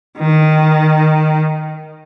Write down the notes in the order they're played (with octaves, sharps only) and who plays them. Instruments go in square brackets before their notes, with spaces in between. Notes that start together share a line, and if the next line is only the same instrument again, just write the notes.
[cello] D#3